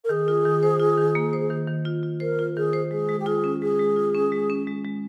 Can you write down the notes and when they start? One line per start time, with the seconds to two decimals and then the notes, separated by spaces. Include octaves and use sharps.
0.04 A#4
0.09 D#3 G#4
0.28 F4
0.45 D#3
0.63 C5
0.80 F4
0.97 D#3
1.15 A#3
1.33 C5
1.50 D#3
1.68 D#3
1.85 F4
2.03 F4
2.20 A#4 C5
2.39 F4
2.56 D#3 G#4
2.73 C5
2.91 G#3 G#4
3.09 G#3
3.19 G4
3.26 F4 G#4
3.44 C#4
3.61 G#3 G#4
3.79 G#3
3.96 F4
4.15 C#4
4.32 G#3
4.50 C#4
4.67 G#3
4.84 G#3